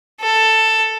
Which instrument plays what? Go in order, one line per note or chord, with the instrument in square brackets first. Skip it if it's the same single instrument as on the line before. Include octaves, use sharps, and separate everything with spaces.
[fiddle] A4